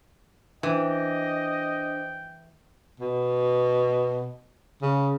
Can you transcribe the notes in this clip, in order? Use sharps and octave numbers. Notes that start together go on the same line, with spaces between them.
E3 D4 C5 D#5 G5
B2
C#3